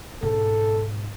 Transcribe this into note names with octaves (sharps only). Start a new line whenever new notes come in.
G#2 B2 A4